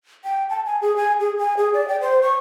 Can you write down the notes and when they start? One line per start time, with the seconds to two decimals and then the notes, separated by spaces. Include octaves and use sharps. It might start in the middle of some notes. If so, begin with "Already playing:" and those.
0.24 G5
0.50 A5
0.66 G#5
0.82 G#4
0.97 G#5
1.20 G#4
1.38 G#5
1.57 G#4
1.74 D5
1.88 G5
2.01 C5
2.22 C#6